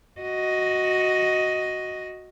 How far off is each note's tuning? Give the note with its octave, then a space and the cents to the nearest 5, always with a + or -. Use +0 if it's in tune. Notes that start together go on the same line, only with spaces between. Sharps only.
F#4 +0 D#5 +5